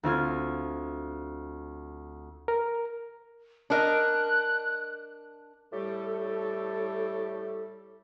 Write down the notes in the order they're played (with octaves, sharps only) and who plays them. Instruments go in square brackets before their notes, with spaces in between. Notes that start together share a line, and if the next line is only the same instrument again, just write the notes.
[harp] D2 C4 F4 G#6
[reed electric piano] A#4
[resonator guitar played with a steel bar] D4 A#4 D#5 [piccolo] F#6
[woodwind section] A2 G3 G4 A4